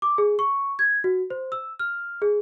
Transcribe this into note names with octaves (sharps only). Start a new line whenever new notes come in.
D6
G#4
C#6
G#6
F#4
C5
E6
F6
G#4